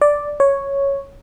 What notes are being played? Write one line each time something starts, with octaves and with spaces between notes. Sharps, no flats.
D5
C#5